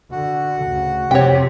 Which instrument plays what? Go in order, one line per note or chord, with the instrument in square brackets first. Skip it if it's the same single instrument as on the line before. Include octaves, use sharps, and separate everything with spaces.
[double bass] D3 [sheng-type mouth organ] F#4
[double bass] D2 C#3
[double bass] F2 [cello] C3 [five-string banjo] C#5 G5